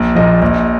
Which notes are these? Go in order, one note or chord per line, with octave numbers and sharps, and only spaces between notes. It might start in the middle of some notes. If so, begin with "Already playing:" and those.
Already playing: A#1
A#2 F3 D#5
A#1